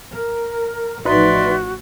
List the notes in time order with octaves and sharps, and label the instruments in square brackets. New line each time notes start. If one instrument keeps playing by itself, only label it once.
[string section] A#4
[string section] A1 F3 [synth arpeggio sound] D#4 B4 [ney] F#4 [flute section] D5 E5 C6